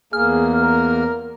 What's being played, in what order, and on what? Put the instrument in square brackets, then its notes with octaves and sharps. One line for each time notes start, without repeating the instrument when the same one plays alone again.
[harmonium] E2 A#3 [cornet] G#4 [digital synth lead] F6
[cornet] A#4